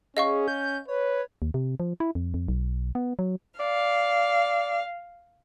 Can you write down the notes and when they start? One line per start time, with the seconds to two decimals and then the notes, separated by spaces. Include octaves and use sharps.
0.17 C#4 G#4 D#5 F5 C#6
0.48 G6
0.88 B4 C#5
1.42 D#2
1.54 C3
1.80 F3
2.00 E4
2.15 F2
2.34 F2
2.48 B1
2.95 B3
3.19 F#3
3.60 D5 F5